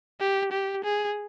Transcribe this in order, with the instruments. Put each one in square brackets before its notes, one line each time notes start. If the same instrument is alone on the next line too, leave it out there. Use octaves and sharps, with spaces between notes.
[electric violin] G4
G4
G#4